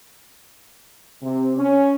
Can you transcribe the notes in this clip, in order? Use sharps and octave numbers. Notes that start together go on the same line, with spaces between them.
C3
C#4